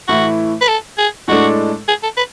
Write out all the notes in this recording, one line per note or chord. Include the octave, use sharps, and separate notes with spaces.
A2 E3 A3 E4 F#4
B4
A4
G#4
A2 G#3 D4 F#4 A4
G#4
A4
B4